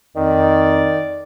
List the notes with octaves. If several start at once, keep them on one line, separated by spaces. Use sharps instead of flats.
F2 D#3 D5